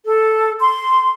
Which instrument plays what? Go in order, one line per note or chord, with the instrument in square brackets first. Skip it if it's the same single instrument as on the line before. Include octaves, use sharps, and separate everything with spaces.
[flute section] A4
C6